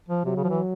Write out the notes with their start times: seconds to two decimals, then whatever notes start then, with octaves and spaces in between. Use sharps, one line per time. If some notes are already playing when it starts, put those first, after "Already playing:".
0.09 F3
0.25 C3 F#3
0.36 C#3
0.44 F3
0.49 E3